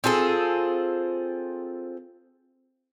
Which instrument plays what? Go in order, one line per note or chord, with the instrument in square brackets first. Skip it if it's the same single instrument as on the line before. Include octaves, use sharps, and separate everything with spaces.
[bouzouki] C4 F4 G#4 A4